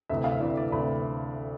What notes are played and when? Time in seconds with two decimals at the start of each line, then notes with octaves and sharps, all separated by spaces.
0.09 D2 C3 E3 E5
0.24 F5
0.32 E5
0.40 D2 C3 E3 D5
0.57 D5
0.72 D2 C3 E3 B5